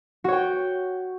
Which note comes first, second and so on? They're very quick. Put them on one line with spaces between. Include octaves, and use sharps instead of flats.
F#4 C#5 G5